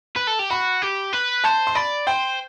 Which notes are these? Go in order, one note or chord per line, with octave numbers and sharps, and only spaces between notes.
B4
A4
G4
F#4 B5
G4
B4
C5 A5
C6
D5 B5
C5 G5